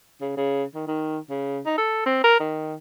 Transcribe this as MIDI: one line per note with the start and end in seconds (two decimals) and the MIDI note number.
0.21 0.35 49
0.37 0.63 49
0.74 0.86 51
0.87 1.18 51
1.30 1.59 49
1.66 1.74 63
1.78 2.01 69
2.06 2.24 60
2.24 2.39 70
2.40 2.74 51